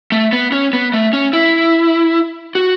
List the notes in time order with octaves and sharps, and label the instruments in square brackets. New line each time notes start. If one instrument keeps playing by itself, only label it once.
[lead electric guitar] A3
B3
C#4
B3
A3
C#4
E4
F#4